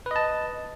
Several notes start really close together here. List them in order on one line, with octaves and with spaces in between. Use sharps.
B4 D#5 A5